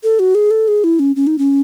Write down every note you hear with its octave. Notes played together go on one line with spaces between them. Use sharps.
A4
F#4
G#4
A4
G#4
E4
C#4
C#4
D#4
C#4